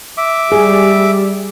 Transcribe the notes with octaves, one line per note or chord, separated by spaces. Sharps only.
E5 D6
G3 G#4